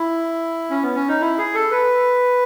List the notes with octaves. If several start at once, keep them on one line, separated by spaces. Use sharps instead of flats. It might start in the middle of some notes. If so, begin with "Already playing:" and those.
Already playing: E4
C#4
B3
C#4
D#4
E4
G#4
A4
B4